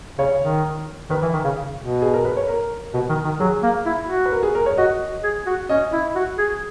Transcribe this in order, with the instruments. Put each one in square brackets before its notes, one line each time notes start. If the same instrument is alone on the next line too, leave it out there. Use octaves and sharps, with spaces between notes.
[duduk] C#3 [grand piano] C#5
[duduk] D#3
[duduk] D#3 [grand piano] B4
[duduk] E3
D#3
C#3
B2
[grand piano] G#4
A#4
B4
C#5
A#4
[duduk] B2
D#3
D#3
[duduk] F#3 [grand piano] G#4
[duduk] A#3
E4
F#4
[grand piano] B4
A#4
G#4
A#4
C#5
[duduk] F#4 [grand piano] D#5
[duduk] G#4
F#4
[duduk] C#4 [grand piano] D#5
[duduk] E4
F#4
G#4